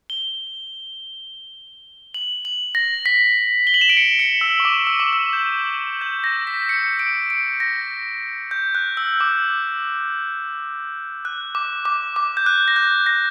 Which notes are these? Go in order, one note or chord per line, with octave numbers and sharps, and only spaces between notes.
G7
F#7
F#7
A#6
B6
G7
F#7
E7
D7
C#7
C#7
E6
C#6
D6
E6
D6
E6
G6
G6
A#6
B6
C#7
D7
D7
A#6
G6
F#6
E6
D6
F#6
D6
D6
D6
G6
F#6
A#6
G6
A#6